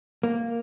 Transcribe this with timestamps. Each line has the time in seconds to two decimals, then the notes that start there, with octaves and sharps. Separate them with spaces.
0.23 A#3